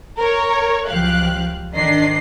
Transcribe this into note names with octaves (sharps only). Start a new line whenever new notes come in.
A#4 C#5
C#2 F#2 F3 G4 F5 F#6
G#1 D#3 D4 D#5 C7